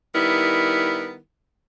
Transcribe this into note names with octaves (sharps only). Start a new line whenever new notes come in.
D#3 G3 B3 E4 A#4